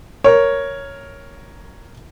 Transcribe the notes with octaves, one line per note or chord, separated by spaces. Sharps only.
A#4 C#5